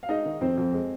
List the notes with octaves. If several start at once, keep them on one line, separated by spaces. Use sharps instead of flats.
F5
G#3 D#4 D#5
D#3
F2 C4 C5
F2
G#3